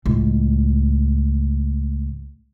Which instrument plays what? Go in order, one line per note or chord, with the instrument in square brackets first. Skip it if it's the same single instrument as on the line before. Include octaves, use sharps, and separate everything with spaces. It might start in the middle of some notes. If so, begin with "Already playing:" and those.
[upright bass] C#2 A2